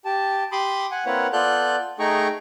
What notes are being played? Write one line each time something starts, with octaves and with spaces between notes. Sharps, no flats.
G4 A5
G4 B5 C6 D6 D#6
F#5 G#5
A#3 C4 E4 B4 C#5 F#5
B3 F4 A4 D5 F#6 G6
A3 D#4 G#4 G5 A#5 C#6